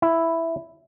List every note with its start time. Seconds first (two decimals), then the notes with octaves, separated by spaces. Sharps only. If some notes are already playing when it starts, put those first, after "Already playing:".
0.02 E4